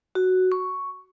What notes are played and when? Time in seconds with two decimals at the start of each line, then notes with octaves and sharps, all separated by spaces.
0.15 F#4
0.52 C#6